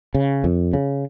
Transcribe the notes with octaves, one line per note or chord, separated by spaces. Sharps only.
C#3
F2
C#3